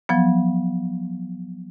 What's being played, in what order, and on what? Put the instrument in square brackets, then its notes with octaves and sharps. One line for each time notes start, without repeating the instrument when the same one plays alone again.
[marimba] F3 F#3 B3